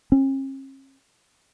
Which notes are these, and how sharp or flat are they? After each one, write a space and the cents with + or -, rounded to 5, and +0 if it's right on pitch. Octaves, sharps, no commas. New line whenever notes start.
C#4 -45